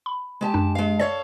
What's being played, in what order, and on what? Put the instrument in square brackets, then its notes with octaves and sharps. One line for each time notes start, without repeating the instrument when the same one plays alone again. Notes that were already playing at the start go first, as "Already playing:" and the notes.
[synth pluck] B5
[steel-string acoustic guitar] G#3 G4 A5
[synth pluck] F#2 D4
[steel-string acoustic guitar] G#3 F5
[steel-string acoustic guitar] A4 C#5 F5 [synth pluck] D5